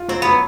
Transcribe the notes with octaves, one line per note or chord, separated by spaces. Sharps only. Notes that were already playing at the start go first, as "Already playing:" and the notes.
Already playing: F4
F#3 C4
F#3 B3